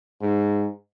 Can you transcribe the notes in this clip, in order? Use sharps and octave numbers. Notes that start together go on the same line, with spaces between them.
G#2